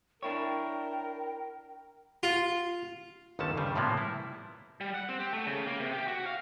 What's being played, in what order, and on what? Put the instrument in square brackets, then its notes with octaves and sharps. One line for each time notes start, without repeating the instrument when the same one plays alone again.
[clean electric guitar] D4 E4 C#5 [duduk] A#4 [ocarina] G5
[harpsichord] F4
[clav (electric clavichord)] G1 D#2 D3 D#3 C#4 A5
G2 C#3 G3
A2 C3 F3 G3 A#3 B3
E4
[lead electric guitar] G3
F#5
C4
G4
A3
C#3
A#3
C3
G4
F#4
F5